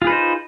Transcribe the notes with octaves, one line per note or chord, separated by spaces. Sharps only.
D#4 F4 G#4 B4 C5